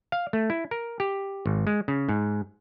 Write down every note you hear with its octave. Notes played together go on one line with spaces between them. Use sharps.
F5
A3
E4
A#4
G4
G#1
G#3
C#3
G#2